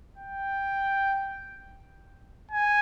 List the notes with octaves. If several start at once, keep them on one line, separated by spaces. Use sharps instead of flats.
G5
G#5